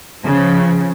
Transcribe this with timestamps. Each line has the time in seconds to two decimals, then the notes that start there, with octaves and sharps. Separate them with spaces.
0.23 C#3 F3